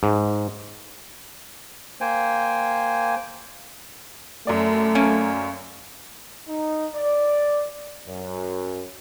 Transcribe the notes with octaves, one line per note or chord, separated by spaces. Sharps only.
G#2
A#3 C5 G5 G#5
F#2 A3 D5
A#3 C#4
D#4
D5
F#2